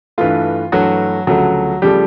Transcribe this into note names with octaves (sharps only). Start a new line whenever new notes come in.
G2 E3 A3 F4
G2 E3 F#3 A3 F#4
D2 C#3 F3 F#3 A3 F#4
C#3 F3 G3 A3 G4